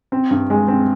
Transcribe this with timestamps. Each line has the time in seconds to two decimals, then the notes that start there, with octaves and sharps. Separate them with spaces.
0.12 C4
0.31 G2
0.50 G#3
0.68 C4